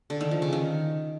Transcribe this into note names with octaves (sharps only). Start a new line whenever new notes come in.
D3
D#3
F3
C#3
D#3